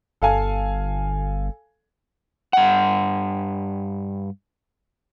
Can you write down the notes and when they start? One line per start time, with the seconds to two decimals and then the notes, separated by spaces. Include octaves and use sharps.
0.22 G1 A4 F5 G#5
2.53 G2 F#5